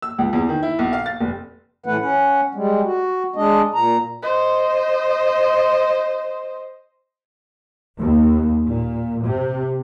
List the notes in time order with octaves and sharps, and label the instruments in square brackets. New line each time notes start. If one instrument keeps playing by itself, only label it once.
[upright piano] E6
C#2
E2
D#3
E4
B1
F5
A6
F1
[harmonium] A2 E3 A3 B4 F#5
C#4 F#5
G3 G#3
F#4
G#3 D4 D#5
A#2 A#5
[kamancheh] C5 D#5
[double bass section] D#2
A#2
C3